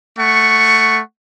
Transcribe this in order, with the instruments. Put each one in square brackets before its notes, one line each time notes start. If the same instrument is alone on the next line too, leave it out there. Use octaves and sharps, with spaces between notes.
[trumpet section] A3 F#5 C#6